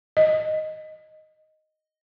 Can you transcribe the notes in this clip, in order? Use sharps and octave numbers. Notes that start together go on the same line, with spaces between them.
D#5